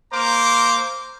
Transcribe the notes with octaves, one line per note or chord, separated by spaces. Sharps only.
A#3 C5 A#5 D6